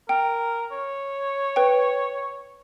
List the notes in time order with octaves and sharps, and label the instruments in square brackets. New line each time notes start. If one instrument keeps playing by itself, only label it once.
[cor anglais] A#4 [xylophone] G5
[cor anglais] C#5
[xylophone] B4 G5